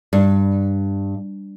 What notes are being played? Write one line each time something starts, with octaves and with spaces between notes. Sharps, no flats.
G2